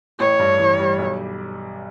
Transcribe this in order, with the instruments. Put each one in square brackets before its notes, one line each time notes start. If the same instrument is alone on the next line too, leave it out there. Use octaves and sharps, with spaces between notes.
[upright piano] A1 [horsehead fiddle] C#5
[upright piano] G2
E3
G3
B1